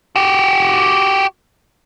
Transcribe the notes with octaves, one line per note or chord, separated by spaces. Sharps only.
F#4 G4